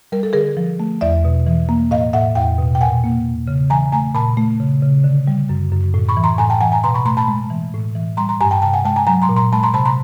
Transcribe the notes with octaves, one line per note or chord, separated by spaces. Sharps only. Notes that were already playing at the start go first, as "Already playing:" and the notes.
G3 A#4
A4
D3 G#4 A#4
F3
A3
E2 D5 E5
B2
E3
A#3
A2 D#5 F5
A2 E5 F#5
E2 F5 G5
B2
G5
A#2 F#5 G#5
A#3
E2
C#3
E3 G#5 A#5
A3 G#5 A#5
A#2 A5 B5
A3
C#3
C#3
D3
G3
F#2
F#2
A2
B5 C#6
E3
A#5 C6
A2 G#5 A#5
G5 A5
E3 F#5 G#5
G#5 A#5
B2 A#5 C6
B5 C#6
A3 A#5 C6
A5 B5
G#3
E3
A2
E3
G3 A#5 C6
A#5 C6
G2 G#5 A#5
G5 A5
C3 G5 A5
F#5 G#5
G#3 G5 A5
G#5 A#5
F#3 G#5 A#5
A#5 C6
A#2
A#5 C6
G#3 A5 B5
A#5 C6
C3 A5 B5
A#5 C6